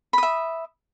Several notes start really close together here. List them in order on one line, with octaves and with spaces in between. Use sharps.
B5 D#6 E5